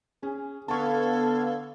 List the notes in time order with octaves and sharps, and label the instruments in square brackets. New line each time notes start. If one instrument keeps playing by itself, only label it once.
[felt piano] C#4 [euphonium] G#4
[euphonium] D3 [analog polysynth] B3 F5 G#6 [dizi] A4 [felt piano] A5 C#6